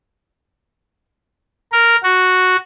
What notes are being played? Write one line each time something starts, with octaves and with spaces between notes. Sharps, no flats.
A#4
F#4